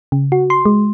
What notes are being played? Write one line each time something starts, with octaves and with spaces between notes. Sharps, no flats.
C#3
F#4
C6
G#3